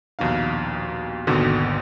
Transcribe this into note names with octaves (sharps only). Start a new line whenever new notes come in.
A#1 D#2 B2 D#4 F5
G#1 D#2 G#2 B2 D3